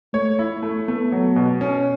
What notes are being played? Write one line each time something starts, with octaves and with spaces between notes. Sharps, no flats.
A3 C#5
E4
A3
A3 B3
F#3
B2
C#4